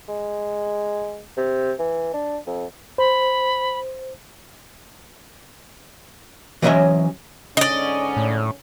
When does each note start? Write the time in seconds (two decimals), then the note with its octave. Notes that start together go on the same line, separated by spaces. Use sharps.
0.08 G#3
1.37 C3
1.79 E3
2.14 D4
2.47 F2
2.98 C5 B5
6.62 E3 F#3 C#4 D#5 E5 G#5
7.57 G#2 D3 C#4 D5 D#5
8.17 A2